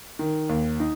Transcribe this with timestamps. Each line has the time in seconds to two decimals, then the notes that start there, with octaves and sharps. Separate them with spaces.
0.19 D#3
0.49 D#2
0.80 D#4